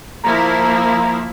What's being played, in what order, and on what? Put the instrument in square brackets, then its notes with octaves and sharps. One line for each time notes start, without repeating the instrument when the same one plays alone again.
[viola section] F3 A#3 E4 [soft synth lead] A#5